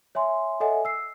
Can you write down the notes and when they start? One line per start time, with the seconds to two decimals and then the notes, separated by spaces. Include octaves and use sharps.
0.15 C#5 E5 G#5 C6
0.60 A4 C#5 D#5 E5 F#5 G#5
0.85 E6 C7